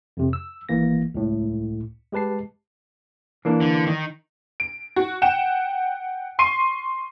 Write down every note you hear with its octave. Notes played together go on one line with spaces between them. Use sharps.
F2 C3
E6
G#1 E3 A#3 A#6
C#2 A2
G#3 G4 B4 A5 C7
E3 A#3 D4
D3
D#3
D7
F#4
F#5 G5 E7
C6 C#6 C7 D#7